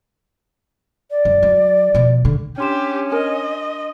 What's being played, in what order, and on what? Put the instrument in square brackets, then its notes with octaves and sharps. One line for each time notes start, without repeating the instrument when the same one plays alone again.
[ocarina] D5
[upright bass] F#2
F#3
B2 F3
D3
[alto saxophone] C#4 [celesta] D4 C6 E7 [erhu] G4
[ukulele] A#4 G#5 [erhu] D#5